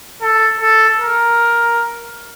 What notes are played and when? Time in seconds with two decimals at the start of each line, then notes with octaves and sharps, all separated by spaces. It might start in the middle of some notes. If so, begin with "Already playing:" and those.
0.22 A4
0.60 A4
0.99 A#4